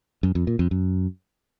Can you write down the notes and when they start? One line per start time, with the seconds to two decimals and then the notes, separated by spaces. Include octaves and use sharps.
0.23 F#2
0.35 F2
0.47 A#2
0.59 F2
0.71 F#2